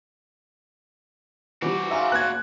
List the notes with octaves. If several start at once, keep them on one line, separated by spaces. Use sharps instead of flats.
E3 F3 G3 F#4 D5
G#2 C#3 F4 E5 G#5 A#5
F#1 B3 F#6 G#6